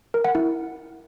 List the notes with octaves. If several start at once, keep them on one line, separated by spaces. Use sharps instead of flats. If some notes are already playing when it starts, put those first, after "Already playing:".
A#4
F#5
E4